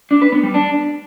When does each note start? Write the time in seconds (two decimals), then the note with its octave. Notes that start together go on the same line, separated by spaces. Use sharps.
0.11 D4
0.22 B4
0.32 B3
0.43 G3
0.54 D4